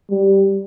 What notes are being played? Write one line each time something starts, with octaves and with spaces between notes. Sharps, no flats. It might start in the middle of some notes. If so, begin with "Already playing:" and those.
G3